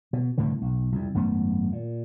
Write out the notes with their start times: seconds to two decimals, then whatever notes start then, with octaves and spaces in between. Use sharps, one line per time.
0.13 B2
0.38 C2 A2 D3 E3
0.61 B1
0.92 C2 F2
1.14 G#1 F#2 A3 B3
1.72 A#2